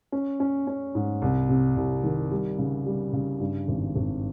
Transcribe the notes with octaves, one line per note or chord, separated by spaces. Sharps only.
C#4
C#4
C#4
G#2
C2
C3
C2
D#3
G3
C#3
G3
C#3
G2
G#1
G#1